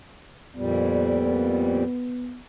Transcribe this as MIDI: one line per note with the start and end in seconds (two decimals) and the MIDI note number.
0.56 1.84 41
0.56 1.84 46
0.56 1.84 55
0.56 2.39 59